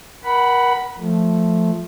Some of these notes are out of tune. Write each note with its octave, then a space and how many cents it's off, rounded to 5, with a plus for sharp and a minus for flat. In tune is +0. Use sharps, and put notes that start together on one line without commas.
A#4 +35 F#5 +15 B5 +0
F3 +0 A3 +0